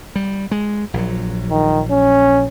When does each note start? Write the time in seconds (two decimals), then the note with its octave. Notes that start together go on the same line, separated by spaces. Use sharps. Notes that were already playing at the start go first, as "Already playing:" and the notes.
0.16 G3
0.51 G#3
0.94 A#1 F#3
1.50 D#3
1.91 C#4